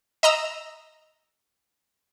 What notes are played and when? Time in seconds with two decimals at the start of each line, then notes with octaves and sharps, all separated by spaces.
0.23 D#5 A#5 E6